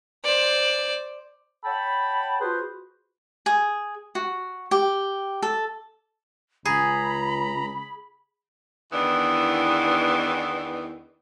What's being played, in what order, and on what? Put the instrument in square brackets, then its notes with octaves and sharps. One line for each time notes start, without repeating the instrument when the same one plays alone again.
[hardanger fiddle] C5 D5
[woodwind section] C#5 F#5 G5 A5 B5
F4 F#4 G#4 B4 C5
[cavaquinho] G#4
F#4
G4
A4
[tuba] C#2 [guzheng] G#4 [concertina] A#5 [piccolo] B5
[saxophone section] E2 D#3 E3 B3 D4